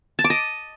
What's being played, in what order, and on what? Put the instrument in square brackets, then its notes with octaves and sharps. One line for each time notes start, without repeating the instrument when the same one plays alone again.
[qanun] A5
D6
D#5